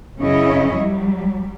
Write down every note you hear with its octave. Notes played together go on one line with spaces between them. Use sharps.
F#2 C#3 C#4 E4 C#5 D#5
F#3 G3